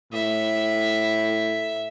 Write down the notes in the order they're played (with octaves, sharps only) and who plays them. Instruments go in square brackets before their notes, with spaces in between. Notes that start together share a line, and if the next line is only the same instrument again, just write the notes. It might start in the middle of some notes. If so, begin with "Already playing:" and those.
[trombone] A2 [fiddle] E5